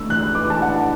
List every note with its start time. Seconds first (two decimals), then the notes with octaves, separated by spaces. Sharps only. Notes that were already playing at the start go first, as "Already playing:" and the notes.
Already playing: A3 D4 E6
0.09 E2 F#6
0.35 E3 D6
0.50 A5
0.62 D4 F#5